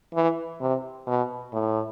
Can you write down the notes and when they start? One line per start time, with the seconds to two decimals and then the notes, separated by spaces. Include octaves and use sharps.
0.15 E3
0.60 C3
1.07 B2
1.53 A2